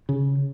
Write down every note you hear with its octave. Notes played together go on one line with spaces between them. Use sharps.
C#3